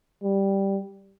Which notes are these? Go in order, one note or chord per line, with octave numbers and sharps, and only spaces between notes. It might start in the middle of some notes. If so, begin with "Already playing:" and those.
G3